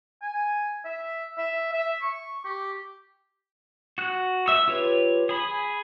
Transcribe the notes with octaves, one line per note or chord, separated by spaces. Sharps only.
G#5
E5
E5
E5
C#6
G4
F#4 F#6
E5 E6
F4 G4 B4 C#5
G#4 B5